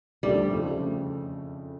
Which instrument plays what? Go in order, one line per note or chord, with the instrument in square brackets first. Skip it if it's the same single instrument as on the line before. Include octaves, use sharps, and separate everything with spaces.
[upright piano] D2 C3 F3 A3 [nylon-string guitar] G3
[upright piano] F2 C#3 F3 A3